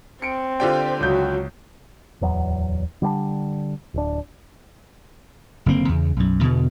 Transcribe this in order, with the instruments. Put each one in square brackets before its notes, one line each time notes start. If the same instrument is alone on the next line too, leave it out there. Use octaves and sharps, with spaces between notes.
[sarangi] C4 [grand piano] C#7 D7
[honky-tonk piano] D3 G4 G5 [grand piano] F4 D5 [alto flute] C5
[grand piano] C#2 G6 [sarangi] F#3 [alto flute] F#4
[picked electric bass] D1 E2 F#3 B3
D3 G3 B3 D4
D1 D4
[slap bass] F#1 D3 A#3 C4
E2 C#3
B1 F#2
E2 B2 D3 E3